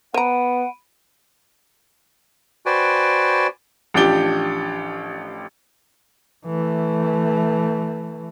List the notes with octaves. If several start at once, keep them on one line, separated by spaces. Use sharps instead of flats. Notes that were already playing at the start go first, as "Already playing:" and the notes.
B3 C5 F#5 A#5 B5 D7 D#7
F#4 B4 C5 D5 G5 G#5
A1 F3 D4 G4 G7
E3 A3